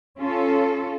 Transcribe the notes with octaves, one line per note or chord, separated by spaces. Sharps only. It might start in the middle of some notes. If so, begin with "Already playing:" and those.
C#4 F4 A4